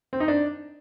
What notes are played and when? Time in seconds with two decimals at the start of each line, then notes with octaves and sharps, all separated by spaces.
0.13 C4
0.20 D#4
0.28 D4